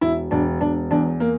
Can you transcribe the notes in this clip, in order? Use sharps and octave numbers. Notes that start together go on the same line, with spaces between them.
E1 E4
E1 D4
E1 D4
E2 D4
A#3